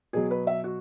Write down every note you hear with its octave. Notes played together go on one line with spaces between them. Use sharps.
B2 F#3 G#4
B4
E5
F#4